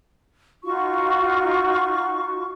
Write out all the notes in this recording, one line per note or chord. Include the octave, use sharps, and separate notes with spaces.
D#4 F4 F#4 C#6